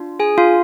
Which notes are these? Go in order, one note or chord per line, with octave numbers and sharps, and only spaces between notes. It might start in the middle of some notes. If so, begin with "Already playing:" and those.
Already playing: D4 F4
G#4 G#5
F4 F5